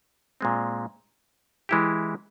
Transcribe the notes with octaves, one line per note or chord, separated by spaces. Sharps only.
A#2 G#3 C4
E3 G#3 E4 G4